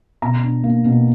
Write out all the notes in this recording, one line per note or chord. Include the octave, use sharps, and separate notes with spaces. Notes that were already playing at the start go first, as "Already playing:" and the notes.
B2 A#5
D4
A#3
B2